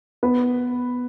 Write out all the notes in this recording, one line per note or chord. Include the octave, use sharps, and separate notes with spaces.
B3 B4